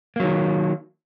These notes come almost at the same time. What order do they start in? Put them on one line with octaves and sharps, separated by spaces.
A#3 F#3 D#3